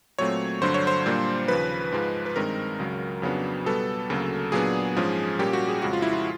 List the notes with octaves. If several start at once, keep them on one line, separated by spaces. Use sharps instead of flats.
A#2 F#3 A3 C4 C#5
G2 D3 F#3 C5
C#5
C5
A#2 G3 A#3 D4
D#2 C#3 F3 B4
G#2 F3 G#3
B4
G2 D#3 G#3 C4 A#4
C#2 C#3 F#3
F2 C#3 F#3 B3 D4
B2 G3 B3 A4
D2 C#3 F#3 A#3
A#2 F#3 B3 D4 G#4
G#2 F3 G#3 C#4
A#2 G3 A#3 C#4 G4
F#4
G#4
F2 C#3 F3 G#3 F#4
F4
E4
F4